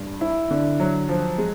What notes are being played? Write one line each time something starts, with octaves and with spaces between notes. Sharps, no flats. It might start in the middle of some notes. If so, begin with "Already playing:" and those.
Already playing: G2
E4
D3
F#3
F3
G#3